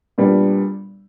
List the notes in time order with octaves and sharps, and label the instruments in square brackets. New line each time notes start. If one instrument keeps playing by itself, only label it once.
[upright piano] A#2 G3 B3 D4